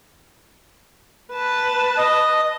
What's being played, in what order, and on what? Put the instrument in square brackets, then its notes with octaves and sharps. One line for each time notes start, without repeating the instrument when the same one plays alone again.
[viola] B4 A5
[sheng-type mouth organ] D#5